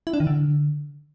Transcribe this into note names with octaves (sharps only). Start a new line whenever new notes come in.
E4
D4
D#3
D3